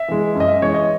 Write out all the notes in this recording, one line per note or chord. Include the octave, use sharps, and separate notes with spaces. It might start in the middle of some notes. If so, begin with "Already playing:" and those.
Already playing: E5
E3 G#3
F#2
D#5
E5
E3 G#3 C#5
D#5